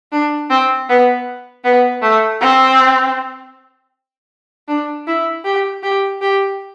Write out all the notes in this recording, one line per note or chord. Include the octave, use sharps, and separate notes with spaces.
D4
C4
B3
B3
A3
C4
D4
E4
G4
G4
G4